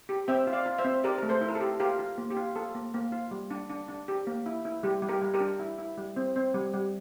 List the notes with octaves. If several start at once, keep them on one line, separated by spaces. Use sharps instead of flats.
G4
C4 E5 G5
F4
D5 F5
F4
C5 E5
C4
G4 A#4 D5
A3 A#4
A4 C5
E4
A#4
A4
G4
F4 G4 A#4
F4
A#3
G4
F4
F4 A4
A#3
A#3
F4
G3
D4
D4
D4
G4
A#3
E4
E4
G3 G4
G3
G4 A#4
G3
G4 A#4
D4
E4
E4
G3
C4
C4
G3
G3